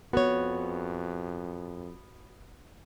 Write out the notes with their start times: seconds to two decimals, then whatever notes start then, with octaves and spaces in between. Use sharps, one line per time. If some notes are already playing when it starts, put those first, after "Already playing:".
0.13 F2 B3 F#4 C#5